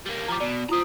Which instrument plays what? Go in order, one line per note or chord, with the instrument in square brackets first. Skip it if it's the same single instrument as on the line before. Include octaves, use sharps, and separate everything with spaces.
[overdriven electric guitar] G3 A#3
[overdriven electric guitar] F3 G3 [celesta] A#5 D6
[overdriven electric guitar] B2 [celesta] D5
[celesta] E4 F4 D#6 [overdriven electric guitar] C5 A#5